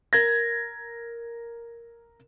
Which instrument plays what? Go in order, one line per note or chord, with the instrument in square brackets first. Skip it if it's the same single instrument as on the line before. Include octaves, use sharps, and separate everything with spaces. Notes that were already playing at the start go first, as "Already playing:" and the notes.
[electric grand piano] A#4 G#6 A#6